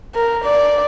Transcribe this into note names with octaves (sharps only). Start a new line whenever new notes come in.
A#4
D5